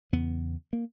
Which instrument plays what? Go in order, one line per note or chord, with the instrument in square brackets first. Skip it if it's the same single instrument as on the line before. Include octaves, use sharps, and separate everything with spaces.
[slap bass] E2 C#3 B3
A#3